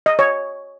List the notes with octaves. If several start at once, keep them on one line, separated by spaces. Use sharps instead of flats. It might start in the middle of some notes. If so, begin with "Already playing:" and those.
D#5
C#5